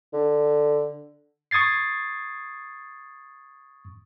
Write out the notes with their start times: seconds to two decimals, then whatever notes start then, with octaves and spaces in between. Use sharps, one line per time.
0.13 D3
1.51 C#6 D#6 G#6 A6 C7